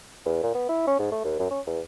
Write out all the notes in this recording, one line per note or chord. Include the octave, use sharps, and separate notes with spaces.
E2
A#2
B3
E4
C#4
G#2
A3
D#2
F#2
C#4
E2